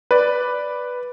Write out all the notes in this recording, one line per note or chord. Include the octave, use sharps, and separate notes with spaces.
B4 D5